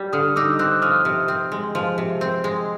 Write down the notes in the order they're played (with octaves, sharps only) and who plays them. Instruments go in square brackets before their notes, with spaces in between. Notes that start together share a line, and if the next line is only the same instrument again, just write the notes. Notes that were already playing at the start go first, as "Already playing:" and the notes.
Already playing: [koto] G3
[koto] D3 [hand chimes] D#6 F6
[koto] D#4 [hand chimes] D6 E6
[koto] C4 [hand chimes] E6 F#6
[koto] F3 [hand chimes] D#6 F6
[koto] C3
C4
G#3
F3
C3
C4
G#3